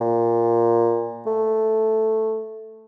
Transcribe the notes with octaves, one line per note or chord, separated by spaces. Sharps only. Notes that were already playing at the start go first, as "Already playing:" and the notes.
A#2
A3